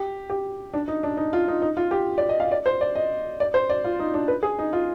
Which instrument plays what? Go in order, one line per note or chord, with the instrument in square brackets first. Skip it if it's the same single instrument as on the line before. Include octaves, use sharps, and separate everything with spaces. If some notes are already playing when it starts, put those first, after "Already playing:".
Already playing: [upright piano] G4
G4
D4
D#4
D4
D#4
F4
D#4
D#4
F4
G4
D5
D#5
F5
D5
C5
D5
D#5
D5
C5
D5
F4
D#4
D4
B4
G#4
D#4
F4